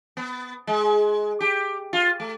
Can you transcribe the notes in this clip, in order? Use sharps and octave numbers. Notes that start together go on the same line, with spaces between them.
B3
G#3
G4
F4
A3